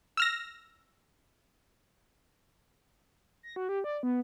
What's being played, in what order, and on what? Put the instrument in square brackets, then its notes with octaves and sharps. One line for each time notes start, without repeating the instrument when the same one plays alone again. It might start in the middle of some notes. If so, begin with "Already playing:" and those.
[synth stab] E6 F6 A#6
[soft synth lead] A#6
F#4
G4
D5
B3